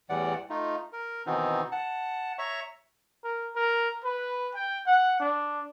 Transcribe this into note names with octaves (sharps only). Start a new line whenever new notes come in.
E2 A2 E3 G3 D5 F#5
A3 D#4 F4
A#4
B2 D#3 E3 B3 C4 D#4
F#5 A5
C#5 E5 A#5 C#6
A#4
A#4
B4
G5
F#5
D4